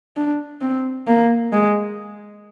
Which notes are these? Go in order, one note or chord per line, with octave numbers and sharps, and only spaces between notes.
D4
C4
A#3
G#3